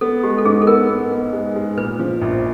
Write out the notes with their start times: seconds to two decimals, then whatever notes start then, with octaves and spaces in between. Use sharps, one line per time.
0.01 B3 A4
0.24 G#3 G4
0.38 A4
0.45 G#2 G#4
0.62 A4
0.67 B3 A#4
0.89 B3
1.12 B3
1.33 G#3
1.56 G#3
1.77 A#2 B4
1.99 F3
2.21 A#1